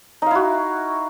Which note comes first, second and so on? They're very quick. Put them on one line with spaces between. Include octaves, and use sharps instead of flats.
D#4 F5 E4 F#4